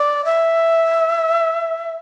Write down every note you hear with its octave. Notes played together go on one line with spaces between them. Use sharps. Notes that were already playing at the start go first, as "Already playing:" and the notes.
Already playing: D5
E5